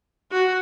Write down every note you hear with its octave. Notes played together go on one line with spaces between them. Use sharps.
F#4